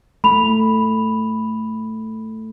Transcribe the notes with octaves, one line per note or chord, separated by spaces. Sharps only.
A3 B5 F7